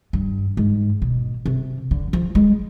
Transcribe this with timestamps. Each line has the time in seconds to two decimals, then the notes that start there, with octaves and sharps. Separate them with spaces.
0.13 G2
0.57 G#2
1.02 B2
1.46 C3
1.91 D3
2.13 F3
2.35 G#3